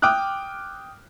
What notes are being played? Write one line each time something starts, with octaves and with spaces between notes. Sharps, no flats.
G5 D6 D#6 F6 F#6